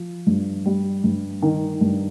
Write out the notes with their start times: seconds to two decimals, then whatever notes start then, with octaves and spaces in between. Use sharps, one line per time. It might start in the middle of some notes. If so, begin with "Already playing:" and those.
Already playing: F3
0.27 G2
0.66 G3
1.04 G2
1.42 D#3
1.81 G2